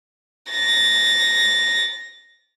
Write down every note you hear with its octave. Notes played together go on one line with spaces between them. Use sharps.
A6 A#6